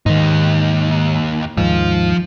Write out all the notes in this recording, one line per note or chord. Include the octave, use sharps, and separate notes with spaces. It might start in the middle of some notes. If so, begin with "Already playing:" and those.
D#2 G#2 D#3 D#4
D#2 G#2 F3 F4